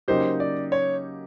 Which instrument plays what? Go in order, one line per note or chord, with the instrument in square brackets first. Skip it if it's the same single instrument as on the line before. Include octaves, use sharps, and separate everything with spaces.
[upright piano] C#3 F#3 A#3 D#4 G4 [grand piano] C5
[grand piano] D5
C#5